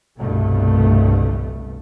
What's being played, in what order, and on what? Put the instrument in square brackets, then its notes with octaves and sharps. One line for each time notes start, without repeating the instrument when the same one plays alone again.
[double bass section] G1 C2 G2 B2 A3